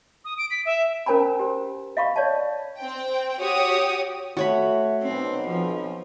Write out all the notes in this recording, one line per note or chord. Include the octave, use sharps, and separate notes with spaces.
D#6
D7
B6
E5
C#4 A#4 C5 G#5 A#5 B5
G4 C5
D#5 F5 B5 C#6
C#5 D5 F5 A5
C4 G5
F#4 G4 C#5 D#6
A3 F#4 C#5 B5
B1 C4
F3